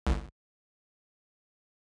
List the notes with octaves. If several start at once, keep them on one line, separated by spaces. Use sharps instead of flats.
G1 C2